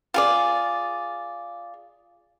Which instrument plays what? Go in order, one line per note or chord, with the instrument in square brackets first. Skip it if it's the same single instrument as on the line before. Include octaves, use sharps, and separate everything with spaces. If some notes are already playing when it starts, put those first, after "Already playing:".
[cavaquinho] F4 G#4 D5